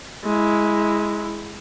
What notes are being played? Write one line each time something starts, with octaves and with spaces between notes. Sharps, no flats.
G#3 E4